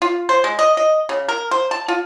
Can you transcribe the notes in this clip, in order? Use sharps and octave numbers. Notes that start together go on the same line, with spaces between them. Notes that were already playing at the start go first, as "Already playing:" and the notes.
F4
C5
G#3
D#5
D#5
C#3
A#4
C5
A5
F4